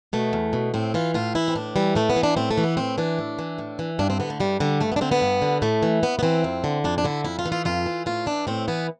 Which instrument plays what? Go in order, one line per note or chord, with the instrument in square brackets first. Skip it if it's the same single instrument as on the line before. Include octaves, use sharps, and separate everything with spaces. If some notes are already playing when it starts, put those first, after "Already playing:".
[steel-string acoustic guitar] B2 A3
E2
B2
A2 C4
E3 F4
A2 F4
E3 E4
C4
A2 D4
E3 G3
A2 A3
B3
E3
D4
A2 C4
A3
E3
B3
A2 C4
E3 D4
A2
E3
A2
E3
G2 D4
C4
D3 B3
A3
G2 G3
D3 G3
G2 A3
B3
D4
D3 C4
B3
G2
D3
A2 A3
E3
A2 B3
B3
E3 C4
F2
D3
F2 D4
D4
D3 E4
F2 E4
F4
E3
F4
F2 F4
E3
A2 F4
E3 D4
A2 C4
E3 B3